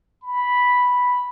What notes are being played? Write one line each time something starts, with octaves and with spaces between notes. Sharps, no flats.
B5